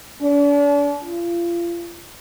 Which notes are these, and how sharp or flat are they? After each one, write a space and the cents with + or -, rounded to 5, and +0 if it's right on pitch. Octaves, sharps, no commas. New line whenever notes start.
D4 -40
F4 -35